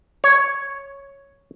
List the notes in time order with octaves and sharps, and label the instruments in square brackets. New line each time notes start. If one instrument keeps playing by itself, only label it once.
[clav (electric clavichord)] C#5